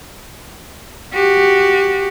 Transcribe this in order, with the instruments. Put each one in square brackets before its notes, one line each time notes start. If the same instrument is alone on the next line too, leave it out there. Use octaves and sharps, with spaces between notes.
[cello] F#4 G4